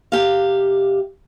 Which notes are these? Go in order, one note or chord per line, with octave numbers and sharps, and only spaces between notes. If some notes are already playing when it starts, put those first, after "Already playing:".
C3 G4 F5